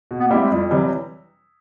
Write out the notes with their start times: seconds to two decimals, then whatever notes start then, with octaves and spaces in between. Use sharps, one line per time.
0.11 B2
0.19 B3
0.27 A#3
0.31 G3 A3 C4 E4 G4
0.43 G#3
0.51 F2 G3
0.71 C3 E3 F#3 G3